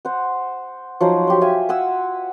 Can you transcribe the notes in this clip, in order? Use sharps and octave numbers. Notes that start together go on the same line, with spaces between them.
C5 F#5
F3 F#3 D#4 C5
G4 C6
E5 F5 G#5
F#5 G#5 E6